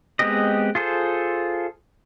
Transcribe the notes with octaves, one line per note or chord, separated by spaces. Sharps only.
G#3 B3 C4 G4 D#5
F4 G#4 A4 C5